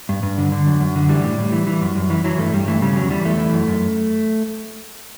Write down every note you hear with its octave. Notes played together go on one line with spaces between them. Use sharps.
G2
G2
D3
D3
F#2
F#2
D3
E3 G3
A2
A2
E3
E3
F#2
F#2
E3
E3 F#3
G2 A3
G2 G3
E3 A3
C#3 G3
E2 F#3
E3 G3
E2 A3
E3
F#2
F#2